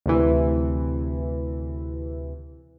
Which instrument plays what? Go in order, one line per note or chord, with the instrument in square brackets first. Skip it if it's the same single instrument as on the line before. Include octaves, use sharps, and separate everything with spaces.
[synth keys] D2 C3 E3